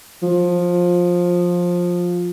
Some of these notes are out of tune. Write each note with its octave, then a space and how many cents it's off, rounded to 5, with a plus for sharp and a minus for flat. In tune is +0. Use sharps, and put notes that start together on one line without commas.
F3 +15